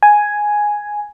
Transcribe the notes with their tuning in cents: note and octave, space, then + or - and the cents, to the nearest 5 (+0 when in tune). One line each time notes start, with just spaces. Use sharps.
G#5 +0